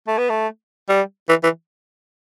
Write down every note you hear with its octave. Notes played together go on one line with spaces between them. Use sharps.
A3
B3
A3
G3
E3
E3